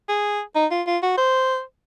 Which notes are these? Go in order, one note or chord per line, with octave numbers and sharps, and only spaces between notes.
G#4
D#4
F4
F4
F#4
C5